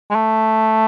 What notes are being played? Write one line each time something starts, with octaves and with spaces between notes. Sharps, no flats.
G#3
A3